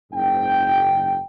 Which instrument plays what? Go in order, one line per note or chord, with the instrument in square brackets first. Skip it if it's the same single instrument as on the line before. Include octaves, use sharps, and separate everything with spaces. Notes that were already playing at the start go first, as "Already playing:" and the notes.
[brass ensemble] F#1 G#2 G5